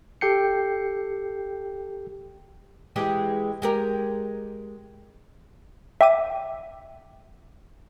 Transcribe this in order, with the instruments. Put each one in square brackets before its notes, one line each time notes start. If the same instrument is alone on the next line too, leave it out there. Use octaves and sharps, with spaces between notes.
[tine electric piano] G4 A4 G5 G6 C7 C#7
[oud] E3 G#3 G4
G#3 G4 A#4
[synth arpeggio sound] E5 G5 D6 D#7